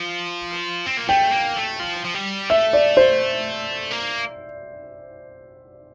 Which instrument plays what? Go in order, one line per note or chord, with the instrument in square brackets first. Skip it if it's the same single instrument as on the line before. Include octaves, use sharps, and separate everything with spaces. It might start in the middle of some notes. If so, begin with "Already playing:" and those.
Already playing: [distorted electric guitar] F3
C4
A#3
[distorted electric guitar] A3 [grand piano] G5
[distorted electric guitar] A#3
A3
F3
F3
G3
[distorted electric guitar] A3 [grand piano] E5
[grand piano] D5
C5
[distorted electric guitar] A#3